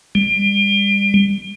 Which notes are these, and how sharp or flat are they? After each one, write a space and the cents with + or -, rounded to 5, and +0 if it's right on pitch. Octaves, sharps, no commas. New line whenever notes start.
G3 +35